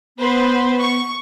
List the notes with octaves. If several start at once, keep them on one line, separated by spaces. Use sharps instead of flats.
B3 B4 C5
C#6